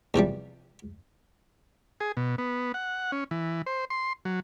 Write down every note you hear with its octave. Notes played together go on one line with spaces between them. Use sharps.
E2 C3 F3 G3
G#4
B2
B3
F#5
C#4
E3
C5
C6
F#3